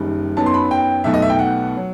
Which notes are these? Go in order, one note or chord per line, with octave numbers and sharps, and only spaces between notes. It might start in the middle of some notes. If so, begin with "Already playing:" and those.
Already playing: F#1 F#2 D#3 G3 D#4
F#2 F#3 B3 D#4 A5
C6
B5
G5
B1 B2 A3 D#4 E5
D#5
E5
G5
F#5
F#3